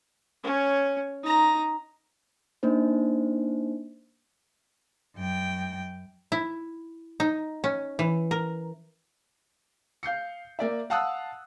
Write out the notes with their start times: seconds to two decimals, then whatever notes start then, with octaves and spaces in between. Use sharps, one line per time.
0.44 C#4 C#5
1.24 D#4 A#5
2.63 A#3 D4 D#4 C5
5.16 F#2 G5
6.32 E4
7.20 D#4
7.64 C#4
7.99 E3
8.31 A#4
10.03 F5 G6 C7 C#7
10.59 A#3 D5 E5
10.90 F5 F#5 A5 D#6 E6 F#6